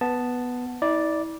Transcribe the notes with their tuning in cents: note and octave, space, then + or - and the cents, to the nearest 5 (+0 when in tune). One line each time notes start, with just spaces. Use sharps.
B3 +0 A5 +0
E4 -45 D5 +0